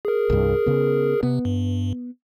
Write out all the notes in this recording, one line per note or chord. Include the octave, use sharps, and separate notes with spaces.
G#4 A#4
C2 G2
C#3 B3
C3 B3
G2